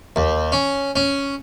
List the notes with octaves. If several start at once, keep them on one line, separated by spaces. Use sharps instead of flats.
D#2
C#4
C#4